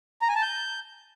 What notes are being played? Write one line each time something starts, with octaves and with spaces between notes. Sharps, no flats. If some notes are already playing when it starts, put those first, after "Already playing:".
A#5
G#5
A5
G6